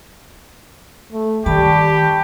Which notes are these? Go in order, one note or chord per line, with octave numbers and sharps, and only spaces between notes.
A3
D#3 G3 G4 A5 B5 C#6